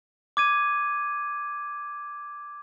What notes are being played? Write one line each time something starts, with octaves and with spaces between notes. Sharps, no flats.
D6 G#6 D#7